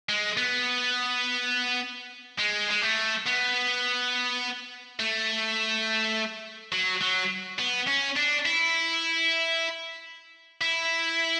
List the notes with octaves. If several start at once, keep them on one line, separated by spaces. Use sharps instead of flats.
G#3
B3
G#3
G#3
A3
B3
A3
F#3
F#3
B3
C#4
D4
E4
E4